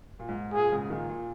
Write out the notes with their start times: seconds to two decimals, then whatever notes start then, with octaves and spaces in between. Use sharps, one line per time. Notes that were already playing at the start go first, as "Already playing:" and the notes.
0.19 A#2
0.28 G#2
0.53 A#2 G#4
0.71 G#2 C#3
0.90 A#2 D#3
1.09 A#2